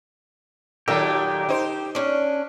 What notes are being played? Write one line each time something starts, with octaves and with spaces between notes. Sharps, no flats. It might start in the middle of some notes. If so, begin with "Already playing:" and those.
A#2 D#3 F#3 G4 A4 A#4 D#5
D#4 C5
C#4 D4